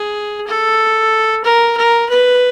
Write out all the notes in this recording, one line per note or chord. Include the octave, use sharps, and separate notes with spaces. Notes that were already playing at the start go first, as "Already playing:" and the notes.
Already playing: G#4
A4
A#4
A#4
B4